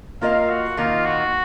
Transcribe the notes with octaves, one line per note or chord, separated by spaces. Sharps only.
A#3 F4 A#4 D#5 F5
F#4
D#3 A#3 D#4 F4
F#4